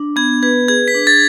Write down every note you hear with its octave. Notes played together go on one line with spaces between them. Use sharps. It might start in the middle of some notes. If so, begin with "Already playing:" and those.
Already playing: D4
B3 G#6
B4 G#6
G#4 G#6
B6
D4
A6